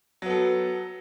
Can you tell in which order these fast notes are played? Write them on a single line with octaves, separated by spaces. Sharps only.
F#3 B3 A4